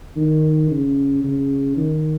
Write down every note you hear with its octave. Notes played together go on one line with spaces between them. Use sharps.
D#3
C#3
C#3
D#3